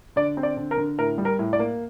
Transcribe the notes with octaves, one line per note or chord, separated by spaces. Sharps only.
D3 D5
C4
D5
D3
A#4
D3
A2 A#4
G3
A#4
A2
D5
A#3